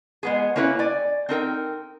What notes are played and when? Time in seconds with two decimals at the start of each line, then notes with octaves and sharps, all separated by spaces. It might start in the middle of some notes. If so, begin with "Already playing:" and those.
0.23 G#3 B3 G#4
0.56 A#3 C#4 E4 B4 C#5
0.79 D5 G#5
1.29 C4 D#4 A#4 G5